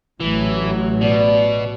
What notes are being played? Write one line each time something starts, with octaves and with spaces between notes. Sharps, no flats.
A1 A2 E3 F#3
B2 D5